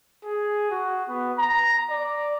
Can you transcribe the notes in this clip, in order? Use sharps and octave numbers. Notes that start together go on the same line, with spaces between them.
G#4
F#4
B3
A#5
D5